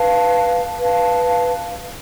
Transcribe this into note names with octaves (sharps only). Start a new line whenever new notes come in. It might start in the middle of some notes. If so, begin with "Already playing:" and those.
Already playing: B4 F5 A5
B4 F5 A5